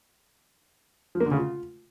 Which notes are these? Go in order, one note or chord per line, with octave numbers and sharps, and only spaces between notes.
F3
A#3
D3
C#3
F4